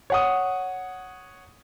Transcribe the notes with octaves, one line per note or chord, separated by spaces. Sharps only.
C#5 F#5 D#6